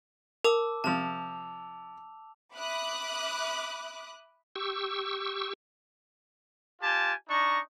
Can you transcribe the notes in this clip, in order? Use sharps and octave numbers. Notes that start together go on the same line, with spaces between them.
A#4 A5 D6 E6
C3 F3 A5 F7
E5 B5 D6 D#6 F#6
G4 C#6 E6
F4 G4 G#5 A5
D4 D#4 A#5 C#6